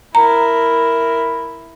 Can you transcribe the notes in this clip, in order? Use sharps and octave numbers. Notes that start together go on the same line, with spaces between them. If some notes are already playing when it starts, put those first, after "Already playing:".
E4 A#4 A#5